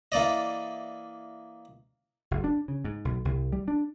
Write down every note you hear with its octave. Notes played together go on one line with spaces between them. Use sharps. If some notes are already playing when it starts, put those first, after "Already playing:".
E3 A#3 D5 D#5
F#1
D4
C#3
G#2
B1
C2
G3
D4